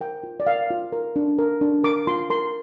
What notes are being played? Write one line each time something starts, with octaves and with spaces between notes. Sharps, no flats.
A#4 G5
F4
D5
A#4 F5
F4
A#4
D4
A#4
D4
A#4 D6
F4 C6
A#4 C6